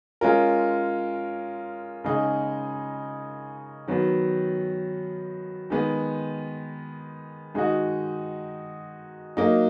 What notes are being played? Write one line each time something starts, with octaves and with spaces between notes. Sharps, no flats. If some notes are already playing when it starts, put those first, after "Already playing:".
G#3 C#4 F4 A#4
C#3 G#3 D#4 G#4
D#3 F#3 B3
D#3 G#3 B3
D#3 G#3 D#4 F#4
F#3 A#3 D#4